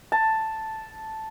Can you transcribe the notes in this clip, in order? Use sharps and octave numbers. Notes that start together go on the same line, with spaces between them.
A5